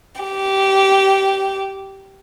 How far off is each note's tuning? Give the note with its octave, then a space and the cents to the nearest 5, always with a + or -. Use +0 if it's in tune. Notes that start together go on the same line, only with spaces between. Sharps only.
G4 -15